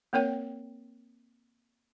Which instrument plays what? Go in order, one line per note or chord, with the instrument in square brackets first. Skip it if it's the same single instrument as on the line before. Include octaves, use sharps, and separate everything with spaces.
[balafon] A#3 C4 A#4 C#5 G5